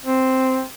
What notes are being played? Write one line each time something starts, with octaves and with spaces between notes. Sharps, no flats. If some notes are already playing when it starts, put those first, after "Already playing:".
C4